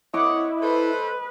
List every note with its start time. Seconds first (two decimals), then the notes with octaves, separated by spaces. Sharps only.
0.14 C4 E4 C#5 D#5 F#5 D6
0.62 A4 B4 C5